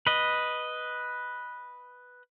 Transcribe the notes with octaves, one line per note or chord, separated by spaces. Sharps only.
B4 D#5